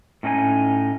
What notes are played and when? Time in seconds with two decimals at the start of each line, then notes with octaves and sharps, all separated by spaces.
0.23 A2 C#4 D#4 D5 G#5